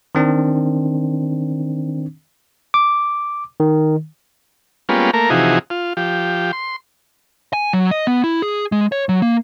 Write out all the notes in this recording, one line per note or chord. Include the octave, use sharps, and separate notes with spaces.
D#3 C4 D4
D6
D#3
G3 G#3 A#3 B3 C#4 F4
A3 A#3 A#4
C3 E3 F3 D#4 F#4 G#4
F4
F3 G4
C6
G#5
F#3
D#5
B3
E4
G#4
G#3
C#5
F#3
A#3